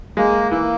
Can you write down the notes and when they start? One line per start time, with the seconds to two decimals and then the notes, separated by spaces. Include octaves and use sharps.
0.17 G#3 A#3
0.51 E3 A#3